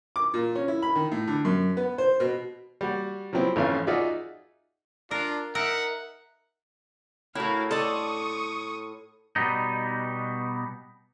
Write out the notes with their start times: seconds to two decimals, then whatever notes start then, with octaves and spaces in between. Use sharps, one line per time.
0.16 D6
0.34 A#2
0.55 C#4
0.68 E4
0.82 B5
0.95 D#3
1.12 A2
1.28 D3
1.45 F#2
1.77 B3
1.98 C5
2.20 B2
2.81 G3 F#4
3.33 F3 F#3 B3 C4 E4
3.56 G#1 F2 E3 C#4 F5
3.87 D#4 F4 F#4 G#4 D5 E5
5.11 D4 F4 A#4
5.55 D#4 A#4 E5 F#5
7.35 A2 E4 F#4 A#4 F5
7.71 A4 D5 C6 C#6 D#6
9.36 B2 G3 B3 D#4